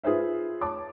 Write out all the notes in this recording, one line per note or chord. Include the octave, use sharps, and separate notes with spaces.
F4 G#4 B4 C5 E5
C#5 A5 D6